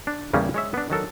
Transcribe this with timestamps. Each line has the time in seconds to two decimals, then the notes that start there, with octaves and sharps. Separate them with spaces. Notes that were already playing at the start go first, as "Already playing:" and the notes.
0.07 D4
0.33 E2 C#3 G3 A#3 C#4
0.54 G#3 C#5 E5
0.74 B3 D4
0.90 D#3 F#3 A4 A#4